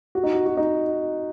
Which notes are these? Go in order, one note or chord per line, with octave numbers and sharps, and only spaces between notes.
F#4
D#4
F#4
F#4
D#4